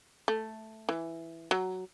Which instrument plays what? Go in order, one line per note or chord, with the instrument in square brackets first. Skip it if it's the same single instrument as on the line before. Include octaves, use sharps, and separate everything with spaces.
[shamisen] A3
E3
F#3